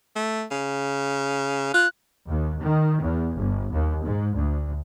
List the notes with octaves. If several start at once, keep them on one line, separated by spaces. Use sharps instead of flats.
A3
C#3
F4 F#6
D#2
D#3
E2
G1
D#2
G#2
D2